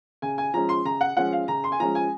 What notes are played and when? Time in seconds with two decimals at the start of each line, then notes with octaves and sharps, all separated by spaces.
0.22 C#3 G#5
0.38 G#5
0.54 F3 G#3 C#4 A#5
0.69 C6
0.85 C#3 A#5
1.01 F#5
1.17 F3 G#3 C#4 F#5
1.33 F5
1.48 C#3 A#5
1.64 C6
1.72 G#5
1.80 F3 G#3 C#4 A#5
1.95 G#5